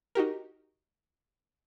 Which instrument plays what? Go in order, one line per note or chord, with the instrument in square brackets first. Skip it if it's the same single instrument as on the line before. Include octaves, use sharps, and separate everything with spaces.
[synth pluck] D#4 F#4 G4 A#4